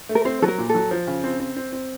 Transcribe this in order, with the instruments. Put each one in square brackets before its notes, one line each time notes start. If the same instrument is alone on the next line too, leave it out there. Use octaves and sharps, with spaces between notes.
[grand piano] A3
[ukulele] A#4
[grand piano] C4 [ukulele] C5
[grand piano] F#3 [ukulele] A4
[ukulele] A#4
[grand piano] A#2
[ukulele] A4
[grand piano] F#3
F3
C#3
C4
C4
C4
C4